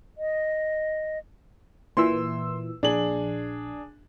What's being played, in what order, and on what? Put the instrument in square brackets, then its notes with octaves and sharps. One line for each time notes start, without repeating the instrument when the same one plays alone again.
[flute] D#5
[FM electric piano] A#2 E3 E6 [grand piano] C6
[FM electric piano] A#1 [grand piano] D4 G#4 F#7